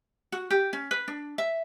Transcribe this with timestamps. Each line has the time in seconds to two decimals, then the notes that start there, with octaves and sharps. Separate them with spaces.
0.32 F#4
0.50 G4
0.73 C#4
0.91 B4
1.08 D4
1.38 E5